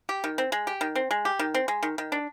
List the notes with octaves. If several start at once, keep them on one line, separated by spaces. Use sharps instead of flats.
G4
D#3
C4
G#3
G4
D#3
C4
G#3
G4
D#3
C4
G#3
D#3
D#3
D4